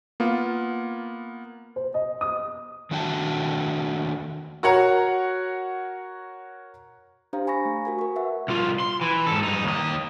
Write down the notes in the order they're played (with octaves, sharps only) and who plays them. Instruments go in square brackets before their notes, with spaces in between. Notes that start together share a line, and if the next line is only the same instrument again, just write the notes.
[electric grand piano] A#3 B3 F4
[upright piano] C5
D#5
D#6
[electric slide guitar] D#3 A3 D4 F#4 G5 A5
[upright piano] F#4 A#4 C#5 F#5 A#5
[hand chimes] D4 G4 C5 F5 A#5
G#5 B5 C#6 A#6
A3
F#4 A#4 G#5
A#4 C#6
B4 E5 F#5
[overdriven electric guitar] C2 F4
C6
E3
G#2 A4
G2 D#4
D#2 D#5